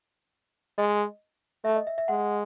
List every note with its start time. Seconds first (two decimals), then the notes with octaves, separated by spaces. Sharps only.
0.78 G#3 D#5
1.65 A3 E5
1.76 D#5
1.87 E5
1.98 E5
2.08 G#3 F#5